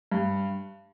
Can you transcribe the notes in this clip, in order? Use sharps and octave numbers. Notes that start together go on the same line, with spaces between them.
G2